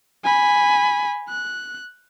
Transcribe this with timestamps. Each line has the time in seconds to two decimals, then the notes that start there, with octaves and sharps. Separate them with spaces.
0.24 G#5 B5
1.29 F#6